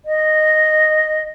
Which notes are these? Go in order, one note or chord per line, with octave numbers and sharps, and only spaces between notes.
D#5